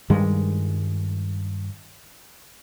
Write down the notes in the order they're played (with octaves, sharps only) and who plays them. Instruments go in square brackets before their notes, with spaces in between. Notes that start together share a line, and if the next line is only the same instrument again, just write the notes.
[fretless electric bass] G2 D#3 G3 G#3